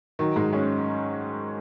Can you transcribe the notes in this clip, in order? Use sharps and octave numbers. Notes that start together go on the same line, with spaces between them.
D#3 F#3
G#2 G#3
G#3 C#4